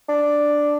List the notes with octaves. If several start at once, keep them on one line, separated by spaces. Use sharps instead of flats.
D4